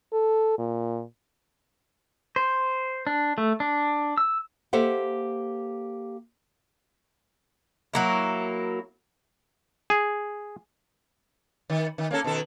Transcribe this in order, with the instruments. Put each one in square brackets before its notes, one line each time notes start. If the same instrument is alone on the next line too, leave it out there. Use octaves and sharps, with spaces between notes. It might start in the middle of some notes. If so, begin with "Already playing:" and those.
[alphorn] A4
A#2
[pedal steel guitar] C5
D4
A3
D4
E6
[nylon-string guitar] A#3 G4 A4 C5 E5 F#5
[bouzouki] F#3 A#3 E4
[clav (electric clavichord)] G#4
[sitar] D#3
D#3
A#3 C#4 A4
B2 D#3 A4